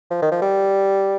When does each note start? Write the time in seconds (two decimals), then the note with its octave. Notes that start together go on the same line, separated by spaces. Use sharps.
0.10 F3
0.22 D#3
0.31 F3
0.42 G3